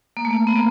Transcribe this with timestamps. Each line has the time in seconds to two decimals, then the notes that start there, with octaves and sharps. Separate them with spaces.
0.17 A#3
0.25 A3
0.31 A#3
0.47 B3
0.55 A#3